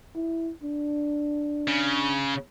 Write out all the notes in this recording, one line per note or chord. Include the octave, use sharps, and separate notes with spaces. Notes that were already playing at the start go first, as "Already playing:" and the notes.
E4
D4
C#3